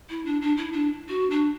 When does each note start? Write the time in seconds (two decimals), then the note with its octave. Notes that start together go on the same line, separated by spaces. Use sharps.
0.09 E4
0.25 D4
0.41 D4
0.56 E4
0.72 D4
1.08 F#4
1.30 D4